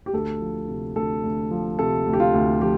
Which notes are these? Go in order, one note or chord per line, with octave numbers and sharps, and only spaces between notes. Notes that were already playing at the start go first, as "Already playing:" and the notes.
G4
D2 A4
F3
C3
D2 A4
D2
F3
C3 A4
D2
G4
F4
D2
F3 G4